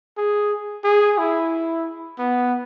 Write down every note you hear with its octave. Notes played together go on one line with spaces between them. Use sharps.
G#4
G#4
E4
B3